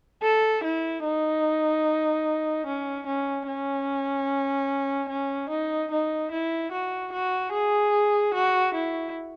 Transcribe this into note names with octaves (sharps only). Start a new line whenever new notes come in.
A4
E4
D#4
C#4
C#4
C#4
C#4
D#4
D#4
E4
F#4
F#4
G#4
F#4
E4